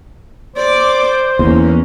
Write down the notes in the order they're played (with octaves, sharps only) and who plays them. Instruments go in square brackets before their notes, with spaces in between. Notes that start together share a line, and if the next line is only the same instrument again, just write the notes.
[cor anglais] C5 [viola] D5 D6
[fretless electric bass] E2 [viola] A#3 C#4